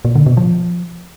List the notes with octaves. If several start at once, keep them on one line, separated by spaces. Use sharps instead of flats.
A#2
D3
B2
F3